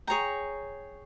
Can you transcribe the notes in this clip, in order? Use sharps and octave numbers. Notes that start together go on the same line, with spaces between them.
G#4 C#5 G5 A#5